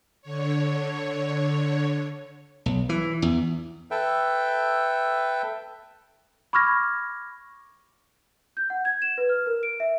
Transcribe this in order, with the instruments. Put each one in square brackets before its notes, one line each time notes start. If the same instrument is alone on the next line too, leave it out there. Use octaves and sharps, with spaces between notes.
[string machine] D3 C#5
[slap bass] B1
E3
E2
[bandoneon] A4 B4 E5 G5
[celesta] B5 C#6 D6 F6 G#6 A#6
G6
F#5
G#6
E7
B4
F6
A#4
D7
E5